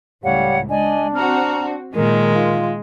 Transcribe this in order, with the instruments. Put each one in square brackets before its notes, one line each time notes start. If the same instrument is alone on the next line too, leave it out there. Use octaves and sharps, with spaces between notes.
[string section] C#2 A2 [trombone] G3 [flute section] C#5 F5 F#5
[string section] G#3 [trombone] D4 [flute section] D5 D#5 G#5
[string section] C4 F#4 [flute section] A#5 F6
[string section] A#2 D#3 [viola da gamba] G#3 [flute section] A#4
[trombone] F4